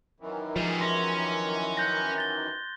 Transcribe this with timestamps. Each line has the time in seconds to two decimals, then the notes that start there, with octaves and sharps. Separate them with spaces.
0.20 F#2 D#3 E3
0.56 F3 G3 G#3 G#4
0.81 C#4 C6 A#6
1.77 F#6 G6 A#6
2.18 A6 G7